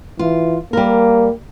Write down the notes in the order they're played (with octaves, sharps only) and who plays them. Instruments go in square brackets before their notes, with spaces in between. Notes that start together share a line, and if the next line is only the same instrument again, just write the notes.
[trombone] E3 [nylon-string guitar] F4
[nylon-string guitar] G3 A#4 [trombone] A#3